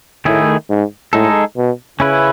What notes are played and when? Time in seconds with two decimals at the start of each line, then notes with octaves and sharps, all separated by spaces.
0.25 A2 D#3 A3 E4 G#4
0.70 G#2
1.13 A2 G#3 D#4 A4
1.57 B2
2.00 C#3 C#4 E4 B4